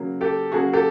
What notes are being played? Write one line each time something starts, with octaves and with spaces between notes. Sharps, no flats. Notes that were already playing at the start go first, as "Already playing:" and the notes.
Already playing: C#3 F#3 A#3
G4 A4
C#3 F#3 A#3 F#4 G#4
G4 A4